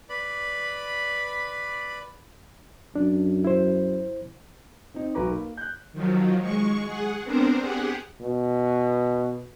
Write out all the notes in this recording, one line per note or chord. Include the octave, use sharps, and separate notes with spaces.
B4 D5 B5
F#2 D4
E4 C5
C4 D#4
B1 F#4 B4 A#5 D6
A#3
F#6 G6
D#3 F3 F#3
G#3 C#6
G#4 F#5
B3 C4 D4 A#4 C5
G4 G#4 F#5
B2